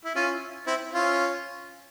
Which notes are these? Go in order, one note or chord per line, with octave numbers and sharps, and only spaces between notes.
E4
C#4 F4
C4 E4
C#4 F4